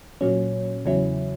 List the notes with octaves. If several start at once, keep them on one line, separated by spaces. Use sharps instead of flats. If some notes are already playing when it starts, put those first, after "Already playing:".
A#2 F#3 C#4
E2 C#3 F#3 C#4 E4